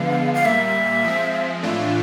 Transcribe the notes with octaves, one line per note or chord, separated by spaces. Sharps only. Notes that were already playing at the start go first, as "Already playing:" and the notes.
Already playing: D3 F3 G#3 B3 F5
F5
A#2 G3 A#3 E5
F3 G#3 C4
A2 E3 A3 D4 F4 E5 F5